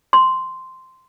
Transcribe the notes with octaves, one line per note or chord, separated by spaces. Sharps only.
C6